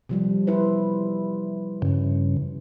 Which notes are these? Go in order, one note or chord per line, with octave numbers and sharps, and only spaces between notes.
C3 F3 G3
E4 B4 C5
G2 C#3